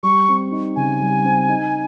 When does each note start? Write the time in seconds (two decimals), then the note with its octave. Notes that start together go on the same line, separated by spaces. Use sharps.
0.03 G3 C#6
0.28 C4
0.51 D#4
0.76 C#3 G#5
1.01 G3
1.25 C4
1.48 D#4